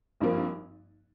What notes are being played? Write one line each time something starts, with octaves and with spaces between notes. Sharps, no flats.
G#1 G2 F3 A#3